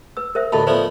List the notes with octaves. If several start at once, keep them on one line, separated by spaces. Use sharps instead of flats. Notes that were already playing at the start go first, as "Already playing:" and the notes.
B4 E6
A#4 C5 E5
A1 D2 A2 D#5 A5 B5
F3 A3 B3 B4 C5 D5